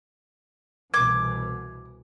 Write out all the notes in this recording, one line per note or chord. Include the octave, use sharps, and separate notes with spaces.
C2 B2 E3 D6 G#6